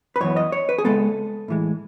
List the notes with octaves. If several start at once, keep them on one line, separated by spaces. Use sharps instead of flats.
B4
F#2 E3 B3 C#5
D#5
C#5
B4
G#4
C#2 B2 G#3 B3 A4
A2 E3 G#3